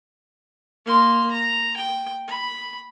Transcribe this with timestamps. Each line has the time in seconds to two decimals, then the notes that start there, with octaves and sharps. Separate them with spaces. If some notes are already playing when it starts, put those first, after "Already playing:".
0.86 A#3 C6
1.31 A#5
1.77 G5
2.28 B5